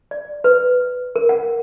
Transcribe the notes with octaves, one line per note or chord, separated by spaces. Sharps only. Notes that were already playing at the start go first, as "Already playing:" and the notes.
D5
B4
A#4
F#5